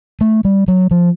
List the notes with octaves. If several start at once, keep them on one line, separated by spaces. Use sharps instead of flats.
A3
G3
F#3
F3